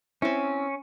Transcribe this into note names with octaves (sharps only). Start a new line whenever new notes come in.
C4 C#4 E4